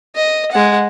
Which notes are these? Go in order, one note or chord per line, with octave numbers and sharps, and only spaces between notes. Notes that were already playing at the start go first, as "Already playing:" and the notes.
D#5
G#3 F#5